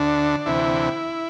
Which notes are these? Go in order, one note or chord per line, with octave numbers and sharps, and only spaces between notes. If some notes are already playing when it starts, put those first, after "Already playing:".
Already playing: D2 D3 D4
D2 C3 E3 E4